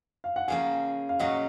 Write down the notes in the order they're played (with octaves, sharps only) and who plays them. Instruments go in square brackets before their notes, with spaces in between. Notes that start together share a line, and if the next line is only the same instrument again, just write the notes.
[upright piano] F5
F#5
[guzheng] C#3 F3 A#3 [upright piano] F5 G#5
[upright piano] F5
[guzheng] A#2 F#3 C#4 [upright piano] D#5 F#5